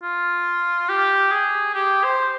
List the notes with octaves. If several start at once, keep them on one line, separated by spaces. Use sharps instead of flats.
F4
G4
G#4
G4
C5